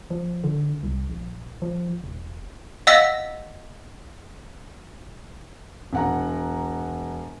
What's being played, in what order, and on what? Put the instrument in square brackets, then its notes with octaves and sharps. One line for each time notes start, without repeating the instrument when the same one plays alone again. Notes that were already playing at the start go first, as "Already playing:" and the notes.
[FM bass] F3
D3
C2
A#1
F3
E1
[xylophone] D#5 F5 F#5 E6 A#6 B6
[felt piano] E1 F#5 A#5